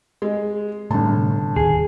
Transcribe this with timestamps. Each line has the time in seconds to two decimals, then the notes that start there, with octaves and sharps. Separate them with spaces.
0.22 G#3
0.91 G1 A2 C3 A3 A5
1.56 D1 D#2 G#4